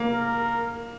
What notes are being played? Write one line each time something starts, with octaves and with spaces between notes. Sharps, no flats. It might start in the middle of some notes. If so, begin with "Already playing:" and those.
Already playing: A#3
A#4